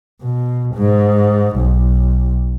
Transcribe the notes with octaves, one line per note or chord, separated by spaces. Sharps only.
B2
G#2
B1